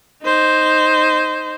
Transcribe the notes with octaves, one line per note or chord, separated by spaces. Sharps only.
D#4 C5